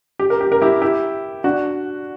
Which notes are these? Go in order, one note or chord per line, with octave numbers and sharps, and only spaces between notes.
G4
A#4
G4
A#4
E4 G4
E4 G4
D4 F#4